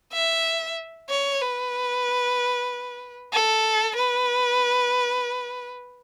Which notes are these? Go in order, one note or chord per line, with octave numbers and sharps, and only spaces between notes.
E5
C#5
B4
A4
B4